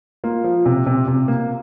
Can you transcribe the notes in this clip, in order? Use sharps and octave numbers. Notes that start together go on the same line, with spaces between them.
A#3 F4
F3
C3
C3
C3
A#3